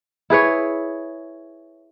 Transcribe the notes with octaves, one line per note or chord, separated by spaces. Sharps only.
E4 G#4 B4 C#5